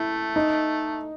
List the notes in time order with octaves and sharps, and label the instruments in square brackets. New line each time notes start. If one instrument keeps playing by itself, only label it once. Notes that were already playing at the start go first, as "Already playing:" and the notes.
Already playing: [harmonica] A3 [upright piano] E4
[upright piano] D#4